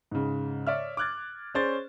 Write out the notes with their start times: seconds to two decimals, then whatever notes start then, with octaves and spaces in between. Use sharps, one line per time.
0.11 G#2 C#3
0.67 C#5 D5 E5 F6
0.97 D6 F6 F#6 G#6 A6
1.55 C#4 G#4 C5 D5 A6